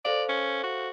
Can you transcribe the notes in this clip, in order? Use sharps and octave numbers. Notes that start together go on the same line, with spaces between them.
A4 C5 D5 F5
C#4
F#4